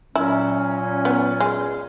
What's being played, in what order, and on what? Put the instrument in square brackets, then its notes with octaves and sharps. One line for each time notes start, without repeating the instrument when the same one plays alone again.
[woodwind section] A#2 F#3 C#4 [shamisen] E4
[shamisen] B3
G#3